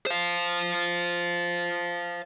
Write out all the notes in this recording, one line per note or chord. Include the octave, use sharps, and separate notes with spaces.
C5 F5